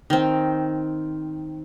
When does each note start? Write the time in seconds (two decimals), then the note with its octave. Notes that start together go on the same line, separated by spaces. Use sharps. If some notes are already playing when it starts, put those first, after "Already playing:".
0.10 D#3 C4